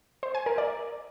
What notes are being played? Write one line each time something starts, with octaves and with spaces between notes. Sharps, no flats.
C5
G#5
A#4
D5